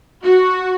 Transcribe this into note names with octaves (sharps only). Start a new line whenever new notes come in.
F#4